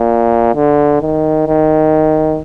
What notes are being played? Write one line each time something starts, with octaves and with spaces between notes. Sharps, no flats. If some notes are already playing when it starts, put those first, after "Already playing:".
Already playing: A#2
D3
D#3
D#3